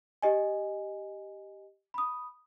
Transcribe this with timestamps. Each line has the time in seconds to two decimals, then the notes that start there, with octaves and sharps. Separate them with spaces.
0.22 G4 D#5 G#5
1.94 B5 D#6